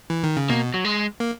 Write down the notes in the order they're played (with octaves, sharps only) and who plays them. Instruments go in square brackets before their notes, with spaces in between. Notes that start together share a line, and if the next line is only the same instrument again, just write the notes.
[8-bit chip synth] E3
D#3
C#3
[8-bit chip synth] B2 [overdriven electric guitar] A#3
[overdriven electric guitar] F#3
G#3
[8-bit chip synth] A#3